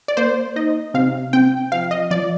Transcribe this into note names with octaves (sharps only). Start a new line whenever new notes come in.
D5
A#3 C5
D#4 D#5
C3 F5
C4 G5
F3 F5
D#5
F3 D5